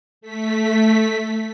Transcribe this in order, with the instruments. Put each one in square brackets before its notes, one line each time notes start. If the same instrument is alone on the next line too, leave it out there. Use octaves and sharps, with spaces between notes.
[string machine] A3 B6